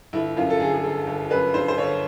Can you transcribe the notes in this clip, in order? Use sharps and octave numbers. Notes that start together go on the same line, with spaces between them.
G1 E4
F#2 F4
A4
D3 G#4
G#4
G1 A4
G1
F#2 B4
D3 C5
C5
G1 C#5